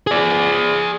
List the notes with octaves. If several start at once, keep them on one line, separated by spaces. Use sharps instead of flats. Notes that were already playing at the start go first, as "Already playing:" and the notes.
G#4 D5